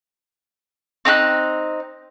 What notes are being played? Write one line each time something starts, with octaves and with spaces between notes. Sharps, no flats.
C4 D#4 A#5 F#6